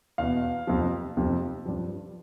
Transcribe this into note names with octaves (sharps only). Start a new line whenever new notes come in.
E2 B2 F5
F2 C3 F3
F2 C3 F3
G2 F3